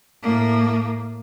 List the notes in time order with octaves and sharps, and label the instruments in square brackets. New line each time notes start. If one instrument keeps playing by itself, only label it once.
[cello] A2 A#3